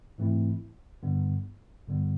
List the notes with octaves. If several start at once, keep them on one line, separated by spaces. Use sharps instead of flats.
G#2 E3 A3 C4 E4
G2 D3 G3 B3
G2 D3 G3 B3